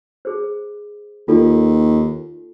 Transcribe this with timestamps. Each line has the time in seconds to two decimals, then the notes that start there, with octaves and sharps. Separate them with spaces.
0.25 G#4 C5
1.28 D#2 F4 A4 D5